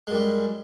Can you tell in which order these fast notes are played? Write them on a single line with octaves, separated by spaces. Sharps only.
G#3 F#2 G3